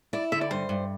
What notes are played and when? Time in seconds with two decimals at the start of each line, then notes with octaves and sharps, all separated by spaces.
0.13 E4 D5
0.32 D3 E5
0.41 D5
0.51 G2 C5
0.69 G2